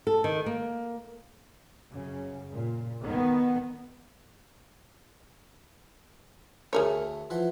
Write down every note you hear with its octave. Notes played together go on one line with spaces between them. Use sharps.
A4
D#3
A#3
F#2 C#3
A#2
D#3 B3
D2 A3 G#4 A#4 C#5
E3 F3 F#5